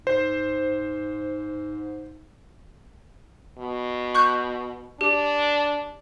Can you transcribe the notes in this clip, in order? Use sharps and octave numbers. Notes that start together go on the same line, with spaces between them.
G#2 C5
B2
C#6 F#6 G6
D4 G4